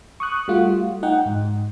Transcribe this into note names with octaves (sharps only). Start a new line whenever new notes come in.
C#6 D#6 F#6
G3 A3 F4 F#4
D#4 F#5 G5
G#2